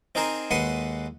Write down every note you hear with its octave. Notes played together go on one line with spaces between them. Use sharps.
C4 D#4 G#4 A#4 C5
D#2 G#3 B4 D#5 F#5 C6